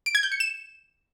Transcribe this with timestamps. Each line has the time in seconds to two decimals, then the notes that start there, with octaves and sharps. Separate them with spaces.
0.06 D7
0.15 G#6
0.23 G6
0.32 C#7
0.40 E7